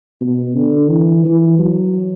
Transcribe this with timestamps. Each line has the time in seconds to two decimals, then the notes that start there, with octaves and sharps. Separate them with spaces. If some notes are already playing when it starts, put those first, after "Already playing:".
0.21 B2
0.55 D3
0.90 E3
1.25 E3
1.59 F#3